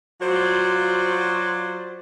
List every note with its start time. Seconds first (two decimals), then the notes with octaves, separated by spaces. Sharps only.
0.22 F#3 F4 F#4 C5 D5